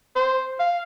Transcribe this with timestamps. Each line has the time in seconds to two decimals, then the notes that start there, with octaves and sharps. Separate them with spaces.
0.16 C5
0.60 F5